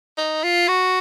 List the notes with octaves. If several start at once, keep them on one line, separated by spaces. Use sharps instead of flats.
D#4
F4
F#4